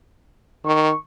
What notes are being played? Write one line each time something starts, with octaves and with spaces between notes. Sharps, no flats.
D#3 C#6